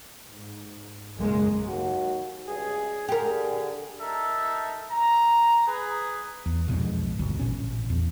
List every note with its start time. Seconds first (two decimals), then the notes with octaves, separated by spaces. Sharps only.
0.24 G#2
1.16 B1 F#2 C#3 G#3 A#3
1.67 D#2 F#4
2.47 C#2 G2 G#4
3.08 D3 G4 G#4 A#4
4.01 D#4 A4 A#4 E5
4.90 A#5
5.66 G#4 B4
6.46 E2
6.68 B1 F2 G#2 B2
7.19 G1 D2
7.40 A1 A#2 C#4
7.90 E2